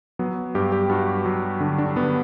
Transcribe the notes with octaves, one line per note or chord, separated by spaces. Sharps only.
F#3 B3
G2 G4
G4
G2 F#4
F#3
D3 D4
D4
D3 B3